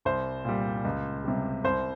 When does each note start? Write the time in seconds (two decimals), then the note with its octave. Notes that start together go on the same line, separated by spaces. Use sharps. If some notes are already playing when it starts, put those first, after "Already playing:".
0.05 C2 C5
0.45 A#2 G3
0.85 C#2
1.24 C3 G3
1.64 C2 C5